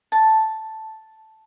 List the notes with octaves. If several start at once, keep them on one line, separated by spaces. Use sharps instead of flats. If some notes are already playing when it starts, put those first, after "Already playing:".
A5